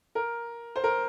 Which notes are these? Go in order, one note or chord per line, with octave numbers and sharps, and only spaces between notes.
A#4
C5
A#4